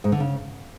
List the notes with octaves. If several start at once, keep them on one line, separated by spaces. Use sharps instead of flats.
G#2
D3
C#3